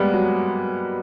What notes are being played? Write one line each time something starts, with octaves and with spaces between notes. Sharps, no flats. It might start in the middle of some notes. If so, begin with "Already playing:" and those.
Already playing: G3 G#3 A#3 B3
F#3